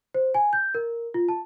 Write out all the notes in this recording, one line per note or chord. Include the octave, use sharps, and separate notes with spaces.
C5
G#5
G6
A#4
F4
A5